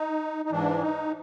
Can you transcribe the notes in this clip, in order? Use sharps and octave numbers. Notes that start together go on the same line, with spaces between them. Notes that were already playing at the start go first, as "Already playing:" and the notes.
Already playing: D#4
D#4
G#2 E3 D4
D#4